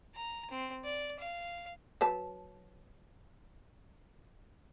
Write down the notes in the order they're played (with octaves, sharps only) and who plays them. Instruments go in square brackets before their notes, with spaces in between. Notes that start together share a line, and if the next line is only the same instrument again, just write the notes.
[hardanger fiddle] A#5
C4
D5
F5
[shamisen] F#3 B4 A5